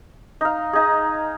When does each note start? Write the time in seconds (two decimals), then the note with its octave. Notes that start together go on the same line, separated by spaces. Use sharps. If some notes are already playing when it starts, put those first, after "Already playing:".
0.41 D#4 F5
0.73 D#4 G#4